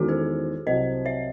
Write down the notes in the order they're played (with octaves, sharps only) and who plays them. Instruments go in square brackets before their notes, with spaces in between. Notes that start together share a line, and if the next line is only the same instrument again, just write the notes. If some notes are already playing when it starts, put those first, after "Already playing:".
Already playing: [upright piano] E2 D#3 G#3 C#4 [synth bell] F#4 A4
[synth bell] G#4 C5
[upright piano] C2 C3 F#3 [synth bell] C5 D#5
[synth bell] C#5 E5